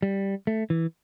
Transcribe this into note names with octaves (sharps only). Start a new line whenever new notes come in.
G3
A3
E3